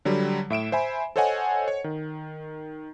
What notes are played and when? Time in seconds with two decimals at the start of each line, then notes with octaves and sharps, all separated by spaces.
0.05 D3 F#3 G3
0.50 A2 E5 D7 E7
0.72 C5 E5 G#5 B5
1.16 A4 C5 C#5 D#5 F#5 G#5
1.68 C#5
1.84 D#3